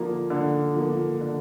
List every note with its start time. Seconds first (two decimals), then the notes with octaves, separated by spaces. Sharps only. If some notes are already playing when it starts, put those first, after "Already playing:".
Already playing: D3 F3 A#3
0.30 D3
0.76 F3 A#3
1.21 D3